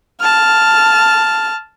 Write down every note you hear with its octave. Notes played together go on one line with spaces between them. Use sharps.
A5 F6